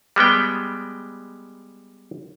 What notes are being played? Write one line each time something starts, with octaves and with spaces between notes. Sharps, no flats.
G3 G#3 B3 G5